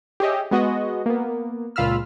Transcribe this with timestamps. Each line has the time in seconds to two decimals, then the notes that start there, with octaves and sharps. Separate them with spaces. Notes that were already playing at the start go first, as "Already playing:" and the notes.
0.20 G4 G#4 C#5 D#5 E5
0.51 G#3 B3 F#4 D#5
1.06 A#3 B3
1.76 C#2 A#2 F4 B5 E6 F6